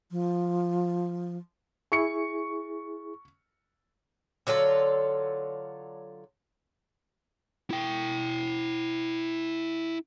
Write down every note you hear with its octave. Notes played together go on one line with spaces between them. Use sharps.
F3
E4 G#4 C#6 C#7
D3 F#3 F4 A4
E4 G5